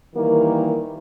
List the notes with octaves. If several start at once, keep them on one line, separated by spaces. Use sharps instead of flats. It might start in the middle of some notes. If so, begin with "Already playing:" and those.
D#3 E3 G3 A#3 A#4